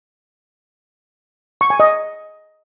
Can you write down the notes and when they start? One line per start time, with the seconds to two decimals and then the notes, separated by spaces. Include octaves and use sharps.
1.61 C#6
1.70 G#5
1.80 D#5